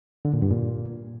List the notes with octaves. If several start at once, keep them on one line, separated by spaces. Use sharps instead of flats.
D3
A#2
G2
A#2